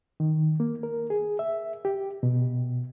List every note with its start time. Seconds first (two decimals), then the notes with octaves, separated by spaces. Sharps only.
0.20 D#3
0.60 A#3
0.83 A#4
1.10 G#4
1.39 E5
1.85 G4
2.23 B2